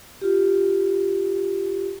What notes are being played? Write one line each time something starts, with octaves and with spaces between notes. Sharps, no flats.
F4 G4